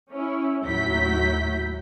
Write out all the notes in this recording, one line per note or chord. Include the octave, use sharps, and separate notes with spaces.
C#4 E4
D#2 A2 F#3 E4 G6 B6